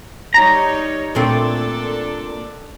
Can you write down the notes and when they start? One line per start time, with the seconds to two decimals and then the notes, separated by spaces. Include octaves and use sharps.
0.34 G3 D#4 C#5 A#5
1.15 A#2 A3 C4 D4 A4